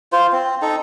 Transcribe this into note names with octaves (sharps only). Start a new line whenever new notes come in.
F4 C5
C4
D#4 A4